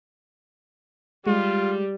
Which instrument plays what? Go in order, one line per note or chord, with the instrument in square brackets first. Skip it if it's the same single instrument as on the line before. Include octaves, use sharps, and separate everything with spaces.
[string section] G3 [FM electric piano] G#3 [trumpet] F4